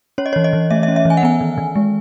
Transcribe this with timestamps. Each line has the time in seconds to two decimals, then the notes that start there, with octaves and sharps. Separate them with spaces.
0.18 C#4 C#5
0.26 D#5
0.33 E3 C#5
0.44 D#5
0.53 E3
0.70 A3 E5
0.83 E5
0.88 C#4
0.96 E5
1.05 E3 G#5
1.17 F#5
1.23 B3 G#5
1.41 D#3
1.58 D#3
1.76 G#3